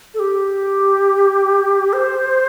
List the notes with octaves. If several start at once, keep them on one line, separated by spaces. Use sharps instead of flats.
A4
G4
C5